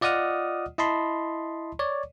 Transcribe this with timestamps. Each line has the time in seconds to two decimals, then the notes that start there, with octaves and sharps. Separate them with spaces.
0.01 F4 D5 D#5 F#5 D#6 F6
0.78 E4 D#5 A5 B5 C6
1.79 C#5 D5